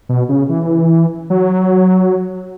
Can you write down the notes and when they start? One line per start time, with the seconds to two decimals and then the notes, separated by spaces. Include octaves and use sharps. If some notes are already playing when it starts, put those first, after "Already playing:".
0.09 B2
0.29 C#3
0.49 E3
1.30 F#3